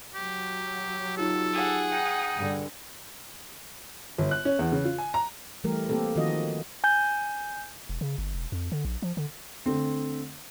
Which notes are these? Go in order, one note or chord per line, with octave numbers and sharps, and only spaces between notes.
F#3 G4
D#4 F4 G4 A4
G#4 F#5
D#4 G5
G2 D3
G1
F#6
C#4
E2
C#3
F4
G#5
A#5
E3 G3 A3 G4 A#4
A#3 C4 G4 A4 B4
D#3 F3 C4 F4 F#4 D#5
G#5 G6
E1
C#3
G1
E1
F2
D3
A#1
F3
D3
D3 A3 C4